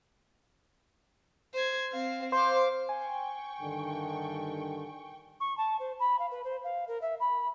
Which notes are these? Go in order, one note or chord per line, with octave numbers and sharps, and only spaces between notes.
C5 G#6
C4 F5
C5 F5 D6
G5 G#5 C#6
G2 D3 D#3
C#6
A5
C5
B5
F5
B4
C5
F5
A#4
E5
B5